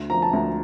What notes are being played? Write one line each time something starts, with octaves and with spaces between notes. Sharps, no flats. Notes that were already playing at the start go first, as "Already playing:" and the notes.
Already playing: D2
F3 A#5
A5
D2 A#5